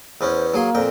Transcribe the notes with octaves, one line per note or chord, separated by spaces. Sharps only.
E2 B3 C#4 C5
F#3 A#3 G#4 C6
F2 A#2 G5